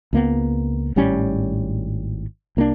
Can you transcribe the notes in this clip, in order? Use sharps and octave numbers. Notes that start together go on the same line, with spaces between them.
C#2 A#3 B3
G#1 A2 G3 C#4
C2 A#3 C4 D4